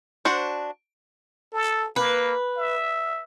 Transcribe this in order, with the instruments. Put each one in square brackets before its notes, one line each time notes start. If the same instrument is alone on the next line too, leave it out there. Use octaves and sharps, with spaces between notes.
[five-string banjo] D4 F#4 C5
[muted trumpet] A4
[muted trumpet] A#3 [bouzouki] B4
[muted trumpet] E5